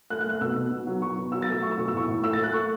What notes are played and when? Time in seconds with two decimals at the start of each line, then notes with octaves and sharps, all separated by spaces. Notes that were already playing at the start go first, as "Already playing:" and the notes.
0.10 A3 F#6
0.21 F#6
0.26 A3
0.31 F#6
0.41 B2 E6
0.56 B2
0.71 B2
0.86 F#3
1.02 F#3 C#6
1.17 B2
1.32 F#3 E6
1.42 A6
1.48 A3 E6
1.63 A3 C#6
1.71 E6
1.78 B2 C#6
1.88 E6
1.93 A2 C#6
2.08 A2
2.23 A3 E6
2.33 A6
2.38 A3 F#6
2.53 A3 C#6